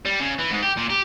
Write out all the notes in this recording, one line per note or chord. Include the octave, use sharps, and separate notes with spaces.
G3
C#3
E3
G#2
G4
A#2
G4